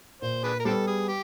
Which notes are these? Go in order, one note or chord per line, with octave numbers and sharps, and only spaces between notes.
A#2 C5
D4 G#4 B4
A#4
G3 B3 C4 D4 A4
G#4
G4